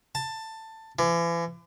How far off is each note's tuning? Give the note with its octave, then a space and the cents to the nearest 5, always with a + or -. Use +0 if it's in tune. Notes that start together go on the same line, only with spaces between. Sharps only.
A5 +15
E3 +40